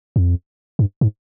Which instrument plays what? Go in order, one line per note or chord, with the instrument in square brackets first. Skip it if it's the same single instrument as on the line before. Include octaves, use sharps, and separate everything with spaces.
[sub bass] F2
G2
G#2